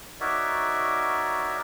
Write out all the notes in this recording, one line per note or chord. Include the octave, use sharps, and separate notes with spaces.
D#4 F#4 A#4 C#5 D5 E5